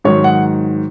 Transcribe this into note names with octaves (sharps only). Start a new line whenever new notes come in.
G#2 D#3 F#3 C#5
F#5